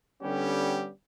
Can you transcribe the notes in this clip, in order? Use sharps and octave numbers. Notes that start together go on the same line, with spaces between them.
D3 G3 B3 C#4 G4